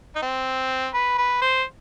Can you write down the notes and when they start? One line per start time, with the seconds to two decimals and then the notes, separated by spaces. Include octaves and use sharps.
0.16 D#4
0.22 C4
0.94 B4
1.18 B4
1.42 C5